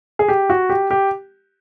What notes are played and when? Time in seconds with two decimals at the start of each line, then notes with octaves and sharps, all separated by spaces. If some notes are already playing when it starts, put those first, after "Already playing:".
0.19 G#4
0.28 G4
0.50 F#4
0.69 G4
0.91 G4